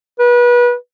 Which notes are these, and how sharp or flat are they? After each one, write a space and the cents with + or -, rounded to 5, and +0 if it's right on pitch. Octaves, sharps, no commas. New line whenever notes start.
B4 -30